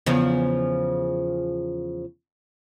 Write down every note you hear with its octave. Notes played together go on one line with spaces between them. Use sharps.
E2 C#3 F3